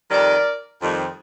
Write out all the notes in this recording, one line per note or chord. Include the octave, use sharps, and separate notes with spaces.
F2 D#3 G3 A#4 D5
F2 D#3 G3